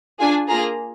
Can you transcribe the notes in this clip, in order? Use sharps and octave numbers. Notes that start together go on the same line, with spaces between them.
D4 F4 G#4 G#5
A#3 F4 G#4 A#5